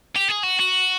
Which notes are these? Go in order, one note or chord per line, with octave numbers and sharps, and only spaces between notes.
G4
G#4
F#4
F#4